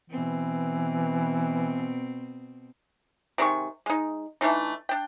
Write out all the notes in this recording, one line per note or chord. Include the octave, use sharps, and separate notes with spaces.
B2 E3 C4
C3 D#3 G#3 C#6
G#3 D#4
E3 A3 D4 D#4
D4 G5